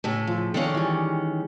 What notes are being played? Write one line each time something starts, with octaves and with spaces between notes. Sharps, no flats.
A2 C#3 A3
F3
D#3 G#3 C#4 A4 D5 F5
E3 G3